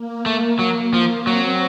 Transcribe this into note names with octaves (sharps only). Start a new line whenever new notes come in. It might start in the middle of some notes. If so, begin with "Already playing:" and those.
Already playing: A#3
A3
F#3
F3
F#3 C4